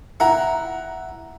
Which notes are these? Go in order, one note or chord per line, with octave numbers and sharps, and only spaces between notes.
E4 F#5 A#5